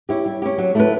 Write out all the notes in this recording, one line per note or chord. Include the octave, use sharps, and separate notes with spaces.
C#4 E4 G4
G3
C#4 E4 G4
F#3
A3 E4 B4